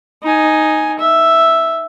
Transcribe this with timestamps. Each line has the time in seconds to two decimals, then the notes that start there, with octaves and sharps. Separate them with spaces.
0.23 D#4 G#5
0.99 E5